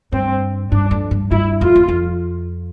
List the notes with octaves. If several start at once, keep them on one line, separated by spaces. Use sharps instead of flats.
G2 C4
G2 D4
F2
G2
G2 E4
F2 F4
E2
F2